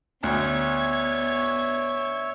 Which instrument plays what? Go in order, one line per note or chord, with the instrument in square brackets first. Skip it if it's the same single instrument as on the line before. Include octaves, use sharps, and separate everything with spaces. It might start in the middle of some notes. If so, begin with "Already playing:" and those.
[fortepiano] D2 [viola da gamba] B3 D4 [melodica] C#5 E5 [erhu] G#6